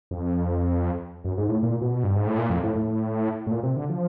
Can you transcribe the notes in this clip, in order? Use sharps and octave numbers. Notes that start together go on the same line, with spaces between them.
F2
F#2
G#2
A2
A#2
B2
G2
G#2
A2
A#2
F2
A2
A2
A2
A#2
C3
D3
F3